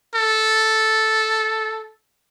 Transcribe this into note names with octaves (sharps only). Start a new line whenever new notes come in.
A4